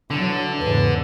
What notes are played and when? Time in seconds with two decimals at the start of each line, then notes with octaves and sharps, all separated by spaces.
0.11 D3 E3 F#3 D4
0.60 E2 G#2 C#3 B4